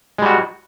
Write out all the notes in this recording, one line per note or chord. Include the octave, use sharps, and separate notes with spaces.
G3 G#3 F#4